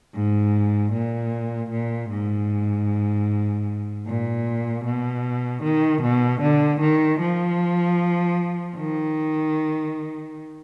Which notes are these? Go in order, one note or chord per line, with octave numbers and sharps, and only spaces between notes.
G#2
A#2
A#2
G#2
A#2
B2
D#3
B2
D3
D#3
F3
D#3